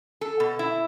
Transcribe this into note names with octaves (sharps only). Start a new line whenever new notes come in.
A4
B2
E4